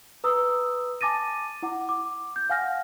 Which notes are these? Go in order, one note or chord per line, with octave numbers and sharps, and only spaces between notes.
B4 A#5 D#6 E6
G#5 A5 D6 A6 A#6 D#7
E4 F#5 D6
D6
G6
F5 F#5 G#5 F6 A#6